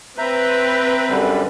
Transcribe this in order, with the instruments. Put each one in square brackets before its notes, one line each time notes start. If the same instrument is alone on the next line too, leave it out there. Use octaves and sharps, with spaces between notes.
[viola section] C4 B4 [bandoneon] E5 A#5 G6
[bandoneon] F#2 D3 G3